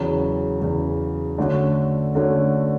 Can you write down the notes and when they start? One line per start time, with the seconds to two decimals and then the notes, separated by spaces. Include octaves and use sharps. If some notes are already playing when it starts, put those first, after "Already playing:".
Already playing: E2 C#3 F#3
0.61 E2 C#3 F#3
1.38 D3 A3 C#4 F#4
2.15 D3 A3 C#4 F#4